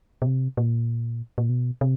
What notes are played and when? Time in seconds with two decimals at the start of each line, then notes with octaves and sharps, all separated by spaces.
0.22 B2
0.26 C3
0.57 A#2
1.38 A#2
1.49 B2
1.81 C3